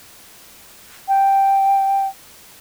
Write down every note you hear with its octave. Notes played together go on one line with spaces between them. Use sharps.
G5